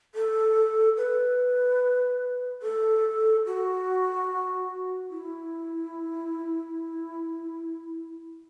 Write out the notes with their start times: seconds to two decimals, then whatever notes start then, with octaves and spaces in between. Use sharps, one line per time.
0.15 A4
0.97 B4
2.62 A4
3.46 F#4
5.10 E4